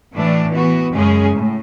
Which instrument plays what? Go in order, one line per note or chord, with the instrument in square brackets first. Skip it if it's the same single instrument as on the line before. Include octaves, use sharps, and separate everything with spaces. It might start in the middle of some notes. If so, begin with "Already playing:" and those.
[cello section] A2 E3 A3 D4
E3 B3 F#4
F#2 C#3 G#3 C#4 G#4
A2